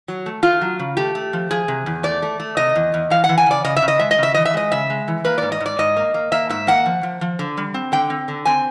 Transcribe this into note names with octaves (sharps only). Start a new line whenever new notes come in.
F#3
A3
A3 F4
F#3
C#3
A3 G4
A3
F3
F3 G#4
C3
E2
A3 D5
A3
A3
C3 D#5
E2
E2
E3 F5
F#5
E3
G#5
C#3 D5
C#3 D#5
E5
C#3
D#5
G#3 E5
D#5
C#3 E5
E3 D#5
E5
G#3 D#5
C#3 E5
G#3
E3
A#3 B4
G#2 D5
D#5
G#2
D5
G#2 D#5
A#3
A#3
A#3 E5
G#2 E5
A#3 F#5
F3
F3
F3
D3
G3
C4
D3 G5
C4
D3
C4 G#5